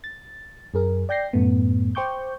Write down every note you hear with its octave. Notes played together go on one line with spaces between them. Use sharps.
A6
F#2 G#4 A#4
D5 G5 G6 A#6 C7
F#2 A2 A3 B3
C5 G5 C#6 D6 G6